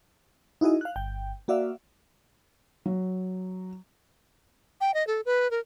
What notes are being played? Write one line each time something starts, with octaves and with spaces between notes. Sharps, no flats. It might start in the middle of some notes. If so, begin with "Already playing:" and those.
D#4 E4 F#4 G#4 D#5
F5 F#6
G1 G5
A#3 F#4 D5 E5 F5
F#3
G5
D#5
A4
B4
A#4